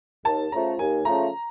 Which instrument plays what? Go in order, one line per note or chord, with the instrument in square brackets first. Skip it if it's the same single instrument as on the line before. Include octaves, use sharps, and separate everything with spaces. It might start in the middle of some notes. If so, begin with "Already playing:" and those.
[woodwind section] D#2 [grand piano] A5
[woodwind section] C#3 F3 A3 [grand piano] A#5
[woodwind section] D#2 [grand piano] G#5
[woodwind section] C#3 F3 A3 [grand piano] A#5